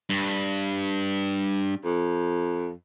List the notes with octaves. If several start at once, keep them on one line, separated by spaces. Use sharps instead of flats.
G2
F2